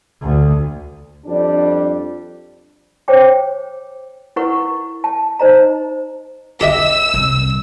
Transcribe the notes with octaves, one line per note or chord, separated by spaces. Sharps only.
D2
F2 G3 D4
C5 C#5 G5 D6
E4 A#4 B4 F#5 C#6
A5
D#4 C5 D#5 A#5
G4 D#5 E5 E6
C2